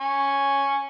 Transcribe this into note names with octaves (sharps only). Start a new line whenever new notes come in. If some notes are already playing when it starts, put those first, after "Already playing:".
G#5 C#6